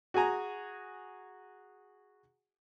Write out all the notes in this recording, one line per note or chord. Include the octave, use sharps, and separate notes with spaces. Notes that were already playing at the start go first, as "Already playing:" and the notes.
F#4 G#4 G#5 A#5